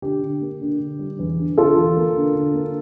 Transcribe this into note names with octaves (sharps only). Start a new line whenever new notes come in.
D3 G4
D3
A#3
D3
D3
G3
E2
D3
D3 F4 A4
E2
A#3
D3
D3
A#3